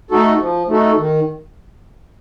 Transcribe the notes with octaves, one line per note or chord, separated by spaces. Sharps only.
A3 D#4 F#4 A4
F3
A3 D#4 F#4 A4
D#3